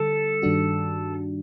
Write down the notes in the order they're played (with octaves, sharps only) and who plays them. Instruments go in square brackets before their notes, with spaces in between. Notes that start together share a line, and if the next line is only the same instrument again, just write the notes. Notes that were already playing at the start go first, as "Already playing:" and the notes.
Already playing: [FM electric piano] D3 G3 [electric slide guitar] A4
[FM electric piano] G2 D#3 G3 D4 F#4